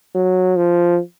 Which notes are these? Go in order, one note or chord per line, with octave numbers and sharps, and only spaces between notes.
F#3
F3